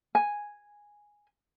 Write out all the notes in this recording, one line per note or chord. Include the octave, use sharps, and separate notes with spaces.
G#5